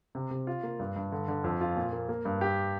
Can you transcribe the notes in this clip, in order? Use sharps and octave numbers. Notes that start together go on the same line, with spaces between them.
C3
C3
F4
A#3
G2
G2
D3
D3
F2
F4
A#2
A#3
A#3
G2
G4